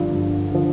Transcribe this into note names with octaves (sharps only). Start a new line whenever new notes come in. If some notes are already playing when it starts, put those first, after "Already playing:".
Already playing: G2 D3 F3
G2
D3 F3